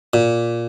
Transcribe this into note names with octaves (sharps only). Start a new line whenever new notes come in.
A#2